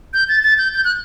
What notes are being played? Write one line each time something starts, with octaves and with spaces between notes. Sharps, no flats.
G6
A6
A6
G6
G6
F#6